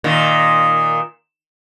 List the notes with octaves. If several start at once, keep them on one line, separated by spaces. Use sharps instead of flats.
A#2 D#3